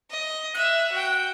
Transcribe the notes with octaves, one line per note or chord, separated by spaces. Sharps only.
D#5
E5 F#6
F#4 G5